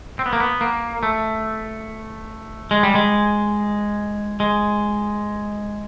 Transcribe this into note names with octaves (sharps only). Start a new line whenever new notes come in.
C4
B3
A#3
B3
A#3
A3
G#3
G3
G#3
G#3